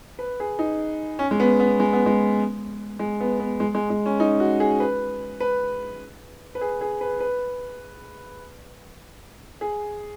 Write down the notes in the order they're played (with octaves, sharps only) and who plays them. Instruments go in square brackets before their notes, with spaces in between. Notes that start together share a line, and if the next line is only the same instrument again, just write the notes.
[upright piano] B4
G#4
D#4
C#4
G#3
B3
B3
G#3
B3
G#3
G#3
B3
B3
G#3
G#3
G#3
C#4
D#4
F#4
G#4
B4
B4
B4
G#4
G#4
B4
B4
G#4